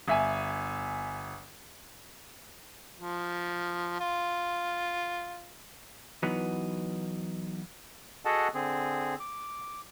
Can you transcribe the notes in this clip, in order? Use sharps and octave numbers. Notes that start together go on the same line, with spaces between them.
G1 E5 G#5
F3
F4
E3 F#3 B3 D#4
F#4 G#4 A4 D#5 F#5 A5
D3 C4 G#4
D6